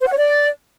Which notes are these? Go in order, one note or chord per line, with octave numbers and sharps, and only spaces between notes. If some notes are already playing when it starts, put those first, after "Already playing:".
C5
F#5
C#5
D5